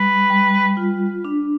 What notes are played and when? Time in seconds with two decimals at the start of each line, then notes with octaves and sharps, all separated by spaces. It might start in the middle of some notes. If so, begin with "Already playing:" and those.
Already playing: G3 B4
0.30 G3
0.77 F4
1.25 D4